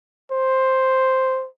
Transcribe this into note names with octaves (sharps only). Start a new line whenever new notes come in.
C5